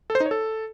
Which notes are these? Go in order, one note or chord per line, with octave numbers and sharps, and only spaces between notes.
A4
C5
D#4
C#5
A4